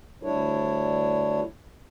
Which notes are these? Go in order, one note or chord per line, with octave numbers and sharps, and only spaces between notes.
D2 G3 D4 E4 C#5